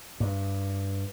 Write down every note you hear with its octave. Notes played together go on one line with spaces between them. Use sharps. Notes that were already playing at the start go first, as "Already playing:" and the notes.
G2